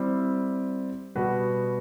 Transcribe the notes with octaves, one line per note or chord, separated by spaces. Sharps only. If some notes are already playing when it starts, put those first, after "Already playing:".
Already playing: G3 C4 E4
B2 G3 B3 F#4 B4